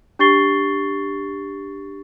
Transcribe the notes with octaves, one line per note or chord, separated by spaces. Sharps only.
D4 G4 C#6 A6 C7 G7